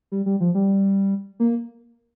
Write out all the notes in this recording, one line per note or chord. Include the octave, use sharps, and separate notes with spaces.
G3
G3
F3
G3
A#3